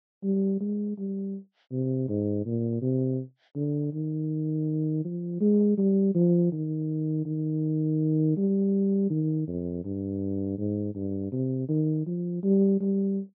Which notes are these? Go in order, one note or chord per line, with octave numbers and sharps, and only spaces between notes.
G3
G#3
G3
C3
G#2
A#2
C3
D3
D#3
F3
G#3
G3
F3
D#3
D#3
G3
D#3
F2
G2
G#2
G2
C3
D#3
F3
G3
G3